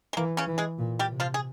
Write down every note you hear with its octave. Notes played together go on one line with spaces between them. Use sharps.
G#3
E3 A#3
C#3 C#4
E3
G#3 G#4
A#2
G3 G4
C3
F3 F4
G#4